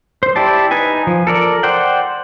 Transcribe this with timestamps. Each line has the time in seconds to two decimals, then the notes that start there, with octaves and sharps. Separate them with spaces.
0.23 C5
0.36 E4 G4 D5 A5
0.71 D#4 B4 G#5
1.07 F3
1.27 A4 A#4 D5
1.63 C5 D5 F#5 G5